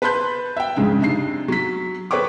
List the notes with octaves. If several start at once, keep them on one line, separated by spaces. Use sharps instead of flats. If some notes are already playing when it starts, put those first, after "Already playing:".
B4 A5 B5 C6 F#6 G6
E5 G5
F2 G#2 C#3 G#3 D4
C3 D4 D#4 C7
F#3 B6
A4 B4 C#5 G5 C#6 D6